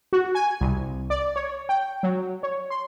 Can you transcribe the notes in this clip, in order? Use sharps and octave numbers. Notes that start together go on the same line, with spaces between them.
F#4
G#5
C2
D5
C#5
G5
F#3
C#5
C6